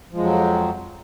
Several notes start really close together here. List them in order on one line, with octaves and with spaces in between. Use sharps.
F3 G#3 F2 F#3